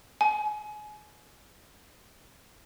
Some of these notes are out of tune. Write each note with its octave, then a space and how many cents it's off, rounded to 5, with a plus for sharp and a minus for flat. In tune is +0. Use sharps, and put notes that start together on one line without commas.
G#5 +30